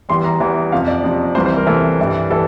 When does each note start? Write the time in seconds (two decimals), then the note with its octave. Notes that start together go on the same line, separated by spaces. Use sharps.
0.09 E2 E3 G3 C6
0.24 A#5
0.40 E2 E3 G3
0.72 F2 C3 F3 F5
0.88 D5
1.04 F2 C3 F3
1.35 C2 C3 E3 C5
1.46 C5
1.57 A#4
1.67 C2 C3 E3 A4
1.99 G2 E3 G3
2.30 E3 G3 A4